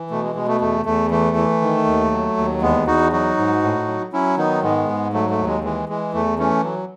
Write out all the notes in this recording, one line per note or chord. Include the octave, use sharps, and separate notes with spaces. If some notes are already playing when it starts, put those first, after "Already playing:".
Already playing: E3
B2 A3
G#3
B2 G#3
A3
E2 A3
E2 A3
E3 A3
E3
D#3
D#2
F#3
D#2
E2 G#3 B3
E2 D#4 F#4
F#3 D#4 F#4
G#2
A2
F#3
F#3 C#4 E4
D#3 B3 D#4
G#2 G#3 B3
G#2
F#3 A3
A3
D#2
G#3
E3 G#3
E3 G#3
E2 A3
E3 A3 C#4
F#3